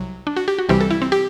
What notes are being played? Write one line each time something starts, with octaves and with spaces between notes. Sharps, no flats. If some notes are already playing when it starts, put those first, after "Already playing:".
Already playing: C2 C3 F#3
D4
F#4
G4
F#4
C2 C3 E3 G3 C4 G4
A4
E4
C4
G4